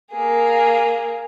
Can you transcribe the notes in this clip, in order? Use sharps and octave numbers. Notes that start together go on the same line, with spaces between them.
A#3 G#4